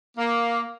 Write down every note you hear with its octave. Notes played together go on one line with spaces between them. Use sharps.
A#3